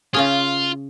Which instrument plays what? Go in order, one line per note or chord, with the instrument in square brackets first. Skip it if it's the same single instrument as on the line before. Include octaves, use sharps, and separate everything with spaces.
[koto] C#3 C#4 G#4 [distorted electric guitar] F4